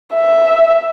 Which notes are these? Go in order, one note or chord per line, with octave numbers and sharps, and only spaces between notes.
E5